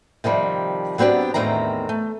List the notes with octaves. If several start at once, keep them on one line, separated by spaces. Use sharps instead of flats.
C3 D#3 F3 G3
F#3 B3 C4 D4 G4
E2 A2 D#3 C4 A#5
A3